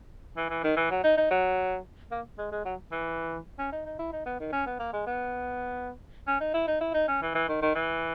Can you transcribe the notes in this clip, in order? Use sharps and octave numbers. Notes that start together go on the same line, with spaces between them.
E3
E3
D#3
E3
F#3
D#4
D#4
F#3
A#3
G#3
G#3
F#3
E3
C#4
D#4
D#4
E4
D#4
B3
D#3
C#4
B3
A#3
G#3
B3
C#4
D#4
E4
D#4
E4
D#4
C#4
E3
E3
D#3
D#3
E3